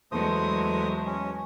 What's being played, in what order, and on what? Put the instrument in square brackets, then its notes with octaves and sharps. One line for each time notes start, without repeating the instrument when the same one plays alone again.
[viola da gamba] E2 F#3 G#3 [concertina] A3 C5 D#6
[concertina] C#4